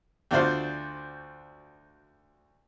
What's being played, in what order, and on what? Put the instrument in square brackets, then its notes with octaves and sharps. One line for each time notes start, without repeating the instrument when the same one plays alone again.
[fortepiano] D2 D4 F4 F#4 C5 F5